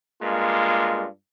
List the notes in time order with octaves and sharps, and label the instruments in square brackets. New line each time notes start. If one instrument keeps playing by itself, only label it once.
[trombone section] G2 G#3 A#3 F4